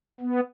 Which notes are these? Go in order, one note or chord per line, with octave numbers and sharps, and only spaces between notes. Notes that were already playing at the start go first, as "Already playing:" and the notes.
B3